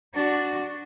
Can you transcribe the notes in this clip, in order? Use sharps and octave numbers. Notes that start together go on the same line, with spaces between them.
D4 F#4